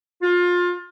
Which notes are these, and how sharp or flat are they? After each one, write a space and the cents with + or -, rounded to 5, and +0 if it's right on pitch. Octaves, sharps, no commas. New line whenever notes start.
F4 +25